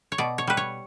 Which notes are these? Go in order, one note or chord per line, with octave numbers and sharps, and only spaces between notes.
C#5
B2 D5
C#5
G3 B4
C#5